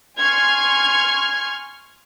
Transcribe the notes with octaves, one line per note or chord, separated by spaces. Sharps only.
G#5 C6 C#6 F6 G#6